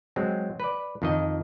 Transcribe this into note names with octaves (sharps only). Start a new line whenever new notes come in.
F#3 G#3 C4
B4 D5
F2 D#3 D#5